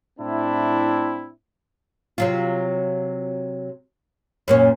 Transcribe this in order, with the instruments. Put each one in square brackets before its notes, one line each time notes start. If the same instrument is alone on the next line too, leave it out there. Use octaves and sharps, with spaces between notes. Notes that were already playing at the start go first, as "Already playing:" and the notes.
[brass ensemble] A2 C4 D4 E4
[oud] C3 F#3 F4
F#2 A#2 C#4